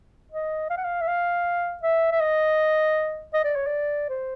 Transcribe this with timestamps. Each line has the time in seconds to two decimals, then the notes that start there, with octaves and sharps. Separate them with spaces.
0.32 D#5
0.70 F5
0.77 F#5
0.85 F5
1.01 E5
1.08 F5
1.83 E5
2.12 E5
2.21 D#5
3.34 D#5
3.45 D5
3.56 C#5
3.67 D5
4.09 C5